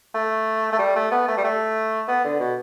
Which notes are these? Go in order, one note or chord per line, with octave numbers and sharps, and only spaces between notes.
A3
A3
G3
A3
B3
A3
G3
A3
B3
D3
B2